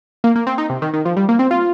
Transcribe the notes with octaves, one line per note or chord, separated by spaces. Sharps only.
A#3
A#3
C4
D#4
C3
D#3
D#3
F3
G3
A#3
C4
F4